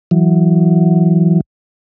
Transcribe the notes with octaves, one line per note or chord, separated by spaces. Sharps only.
E3 F#3